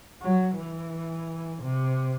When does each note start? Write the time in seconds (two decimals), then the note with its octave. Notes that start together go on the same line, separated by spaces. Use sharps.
0.21 F#3
0.56 E3
1.62 C3